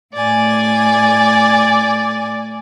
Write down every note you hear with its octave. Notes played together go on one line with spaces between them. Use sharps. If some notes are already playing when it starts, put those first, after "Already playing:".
A2 D5 G#5